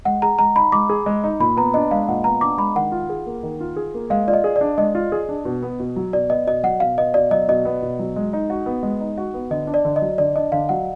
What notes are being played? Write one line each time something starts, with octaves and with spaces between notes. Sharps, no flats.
G#3 F#5
G#4 A#5
G#3 A#5
D#4 B5
G#3 D6
G#4
G#3
D#4
A#2 B5
B3 A#5
D4 D#5
G#3 F5
A#2 F#5
B3 A#5
D4 D6
G#3 B5
D#3 F#5
F4
G#4
A#3
D#3
F4
G#4
A#3
G#3 F5
F4 D5
D#5
G#4
D5
D4
G#3 D#5
F4
G#4
D4
B2
B3
B2
F#3
B2 D5
B3 D#5
B2 D#5
F#3 F#5
B2 F5
B3 D#5
B2 D5
F#3 D#5
B2 D#5
B3
B2
F#3
G#3
D#4
F#4
B3
G#3
D#4
F#4
B3
D3 D#5
D4
D5
D3
D#5
F#3
D3 D5
D4 D#5
D3 F5
F#3 F#5